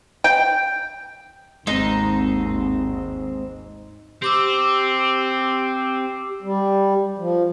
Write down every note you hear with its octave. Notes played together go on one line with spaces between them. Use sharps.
G5
G#1 D#2 G#3 C4 D#4
C4 G4 D6 E6
G3
F3